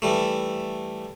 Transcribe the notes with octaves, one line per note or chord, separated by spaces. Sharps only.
E3 G3 A3